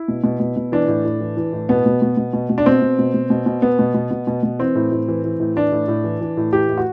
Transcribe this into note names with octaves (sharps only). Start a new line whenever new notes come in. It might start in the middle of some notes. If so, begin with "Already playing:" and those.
Already playing: E4
B2
B2
B2
B2
E3 D4
A2
A2
E3
E3
A2
B2 B3
B2
B2
B2
B2
B2
D4
B2 C4
B2
B2
B2
B2
B2
B2 B3
B2
B2
B2
B2
B2
E3 C4
A2
A2
E3
E3
A2
E3 D4
A2
A2
E3
E3
A2
E3 G4
A2
F#4